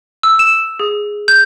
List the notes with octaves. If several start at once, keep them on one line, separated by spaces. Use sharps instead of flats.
E6
E7
G#4
G6